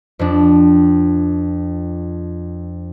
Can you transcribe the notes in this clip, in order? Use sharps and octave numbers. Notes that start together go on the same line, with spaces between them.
F2 D4